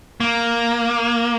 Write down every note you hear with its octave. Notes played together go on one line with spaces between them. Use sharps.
A#3